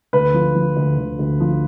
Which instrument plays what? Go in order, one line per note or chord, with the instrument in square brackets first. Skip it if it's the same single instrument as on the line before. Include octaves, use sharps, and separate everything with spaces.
[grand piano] D2 B4
F3
F3
D2
D2
D2
F3